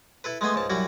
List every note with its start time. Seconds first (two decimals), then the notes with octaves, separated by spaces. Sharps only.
0.24 E4 A4 B4
0.41 G#3 A3 B3 G#5 C6
0.55 C#2 G#2 A5
0.70 F#2 G3 E4 F#4